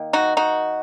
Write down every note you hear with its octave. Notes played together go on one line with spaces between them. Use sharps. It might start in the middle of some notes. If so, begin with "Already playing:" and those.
Already playing: D#3 A#3
D#4 F#4
D#4 F#4